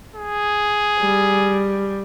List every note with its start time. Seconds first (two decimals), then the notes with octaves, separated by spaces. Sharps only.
0.15 G#4
1.00 G3